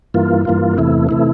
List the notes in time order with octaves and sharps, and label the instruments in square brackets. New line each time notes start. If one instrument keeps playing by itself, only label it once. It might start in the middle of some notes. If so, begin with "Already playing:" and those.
[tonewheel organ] G2 E3 A#3 F4
G2 E3 A#3 F4
E2 C3 E3 A3 E4
C3 E3 A3 E4